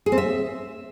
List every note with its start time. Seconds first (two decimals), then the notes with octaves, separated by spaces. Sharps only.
0.06 G#4
0.12 C4
0.18 E5